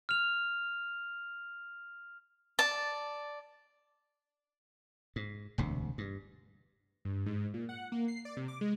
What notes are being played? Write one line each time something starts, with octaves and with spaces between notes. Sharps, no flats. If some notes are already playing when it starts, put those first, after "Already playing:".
F6 F7
D5 A5
G#2
E1 D2 C3
G2
G2
G#2
A#2
F#5
A#3
C7
D5
C3
D6
G#3